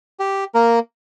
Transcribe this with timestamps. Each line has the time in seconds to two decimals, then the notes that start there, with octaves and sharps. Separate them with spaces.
0.20 G4
0.54 A#3 A#4